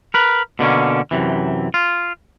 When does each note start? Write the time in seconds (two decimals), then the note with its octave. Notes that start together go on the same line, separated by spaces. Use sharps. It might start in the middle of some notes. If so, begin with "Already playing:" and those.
0.14 A#4 B4
0.59 B2 D3 A#3 C#4
1.11 F#2 C3 E3
1.74 F4